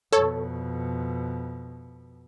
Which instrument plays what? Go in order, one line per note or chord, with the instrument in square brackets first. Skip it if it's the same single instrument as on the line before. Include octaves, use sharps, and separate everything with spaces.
[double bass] F2 B2 [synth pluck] A4 C#5